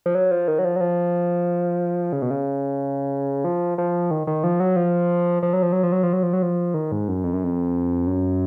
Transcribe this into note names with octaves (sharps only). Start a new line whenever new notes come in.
F3
F#3
F3
D#3
F#3
F3
F#3
F3
C#3
B2
C#3
F3
F3
D#3
D#3
F3
F#3
F3
F3
F#3
F3
F#3
F3
F#3
F3
F#3
F3
F#3
F3
D#3
G#2
F#2
F2
F#2
F2
F#2